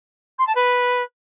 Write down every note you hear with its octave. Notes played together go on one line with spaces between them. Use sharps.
C6
A5
B4